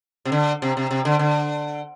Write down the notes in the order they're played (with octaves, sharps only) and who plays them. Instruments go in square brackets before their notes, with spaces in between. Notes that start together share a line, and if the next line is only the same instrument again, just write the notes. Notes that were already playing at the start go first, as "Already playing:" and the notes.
[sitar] C3
D3
C3
C3
C3
D3
D3